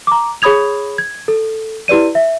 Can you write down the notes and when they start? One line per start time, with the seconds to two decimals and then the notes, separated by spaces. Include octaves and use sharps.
0.07 A#5 D6
0.42 G#4 C#5 B5 D#6 G#6 F7
0.98 G#6
1.28 A4
1.88 E4 G4 B4 D5 D#7
2.15 E5